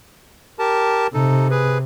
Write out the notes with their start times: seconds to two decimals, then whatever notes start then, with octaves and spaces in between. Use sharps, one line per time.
0.59 G4 A#4 A5
1.14 C3 D#4 A4
1.51 G#4 B4